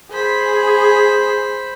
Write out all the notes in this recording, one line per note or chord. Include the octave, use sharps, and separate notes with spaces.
G#4 C5 B5